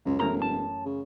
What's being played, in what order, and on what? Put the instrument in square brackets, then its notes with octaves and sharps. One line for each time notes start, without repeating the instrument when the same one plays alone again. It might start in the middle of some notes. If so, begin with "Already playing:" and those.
[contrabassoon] C#2 [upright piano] F#2
[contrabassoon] E1 [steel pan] E3 A3 A#4 [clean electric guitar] A#5
[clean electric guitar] A5
[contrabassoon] C#3